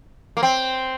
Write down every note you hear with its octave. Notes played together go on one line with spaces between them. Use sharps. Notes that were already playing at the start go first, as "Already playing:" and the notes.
A#3
C4